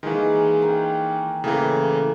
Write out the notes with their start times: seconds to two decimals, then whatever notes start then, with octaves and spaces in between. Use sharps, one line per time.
0.03 D#3 E3 G#3 A#3
0.62 A#4 G5
1.44 A2 C#3 E3 A#3